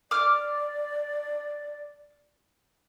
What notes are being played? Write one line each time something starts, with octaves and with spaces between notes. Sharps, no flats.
D5 D6 F6